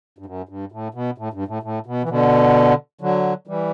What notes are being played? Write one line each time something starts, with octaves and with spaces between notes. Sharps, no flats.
G2
F#2
G2
A2
B2
A2
G2
A2
A2
B2
E3
B2 D3
D3 F#3
E3 G3